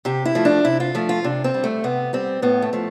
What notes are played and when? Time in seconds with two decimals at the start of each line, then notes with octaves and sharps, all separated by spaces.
0.05 C3 G4
0.25 E4
0.35 F3 A3
0.45 D4
0.65 C3 E4
0.80 F4
0.95 F3 A3
1.09 F4
1.24 C3 D4
1.44 C4
1.54 G3
1.64 A3
1.84 C3 B3
2.13 G3 C4
2.42 A2 B3
2.62 A3
2.73 F3 A3